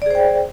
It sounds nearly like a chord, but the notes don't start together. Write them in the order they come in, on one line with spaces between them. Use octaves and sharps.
D5 G#4 C5 G5